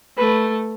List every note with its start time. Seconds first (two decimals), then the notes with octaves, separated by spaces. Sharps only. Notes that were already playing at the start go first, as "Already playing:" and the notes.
0.17 A3 B4